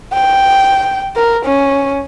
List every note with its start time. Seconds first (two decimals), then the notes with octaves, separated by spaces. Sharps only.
0.13 G5
1.16 A#4
1.45 C#4